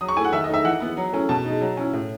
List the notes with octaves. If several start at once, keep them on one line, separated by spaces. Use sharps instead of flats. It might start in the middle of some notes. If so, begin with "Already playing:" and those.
F#3 D#6
C#6
A3 E4 G#5
F#5
D#3 E5
D#5
A3 D#4 E5
E3 F#5
B3 E4
F#3
A3 C#4 E4
B2 A5
G#3 D#4
F#3
C#4 E4
A2